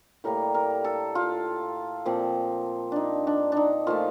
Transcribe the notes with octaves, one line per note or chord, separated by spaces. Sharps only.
A2 G3 A#3 A#4
A#4
A4
F4
A#2 F3 C4
D4 D#4
D4
D4 D#4
A#2 F3 A3 F4